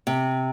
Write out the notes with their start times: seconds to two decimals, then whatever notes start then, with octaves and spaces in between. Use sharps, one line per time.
0.07 C3